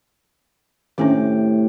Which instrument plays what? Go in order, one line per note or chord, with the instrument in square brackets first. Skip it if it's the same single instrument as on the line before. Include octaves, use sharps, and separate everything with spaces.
[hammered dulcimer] A2 C3 D6 [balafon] D#3 C#4 D4